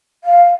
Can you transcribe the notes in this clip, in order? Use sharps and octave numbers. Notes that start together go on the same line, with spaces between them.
F5